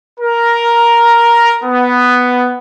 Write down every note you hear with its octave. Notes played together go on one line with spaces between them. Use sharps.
A#4
B3